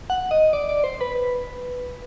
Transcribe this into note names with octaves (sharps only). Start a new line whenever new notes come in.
F#5
D#5
D5
D5
C5
B4